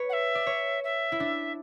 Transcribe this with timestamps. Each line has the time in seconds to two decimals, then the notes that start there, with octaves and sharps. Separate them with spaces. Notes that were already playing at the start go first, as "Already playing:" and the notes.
Already playing: B4 C#5
0.09 F#5
0.13 E5
0.35 D5
0.47 C#5
0.83 E5
1.12 E4
1.20 D4